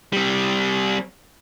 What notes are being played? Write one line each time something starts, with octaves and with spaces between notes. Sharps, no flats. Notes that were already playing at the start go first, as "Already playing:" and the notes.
G3 C4